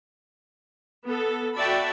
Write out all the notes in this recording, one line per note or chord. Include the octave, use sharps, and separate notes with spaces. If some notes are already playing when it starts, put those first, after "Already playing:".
B3 A4
F#4 D5 E5 G5 A5 B5